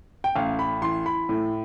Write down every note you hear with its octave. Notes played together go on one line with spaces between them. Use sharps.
G5
A1 F5
B5
E3 C6
B5
A2